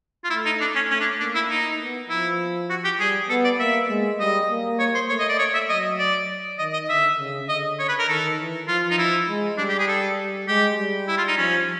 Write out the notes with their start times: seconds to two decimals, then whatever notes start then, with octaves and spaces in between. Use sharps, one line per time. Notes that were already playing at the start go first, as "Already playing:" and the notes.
0.24 F4
0.30 A3 E4
0.45 D#4
0.60 D4
0.75 C#4
0.90 A3 C#4
1.00 D4
1.20 A#3 D4
1.35 E4
1.50 D#4
1.80 B3
2.10 F3 E4
2.70 F#4
2.84 G4
3.00 G3 G#4
3.30 B3 A4
3.44 D5
3.59 A#3 E5
3.89 G#3
4.19 G3 D#5
4.50 A#3
4.79 C#5
4.95 C5
5.09 A3 C#5
5.19 D#5
5.29 D5
5.39 C#5
5.54 E5
5.69 F#3 D#5
5.99 D5
6.59 D#3 D#5
6.73 D#5
6.89 D3 E5
7.19 C#3
7.48 D3 D#5
7.79 C#5
7.88 B4
7.99 A#4
8.09 D#3 A4
8.39 E3
8.68 F3 F4
8.91 D#4
8.98 E4
9.29 G#3
9.58 G3 D4
9.69 G4
9.78 G#4
9.88 A4
10.48 G#3 G4
10.78 G3
11.08 E4
11.18 F4
11.28 D#4
11.38 F3 C#4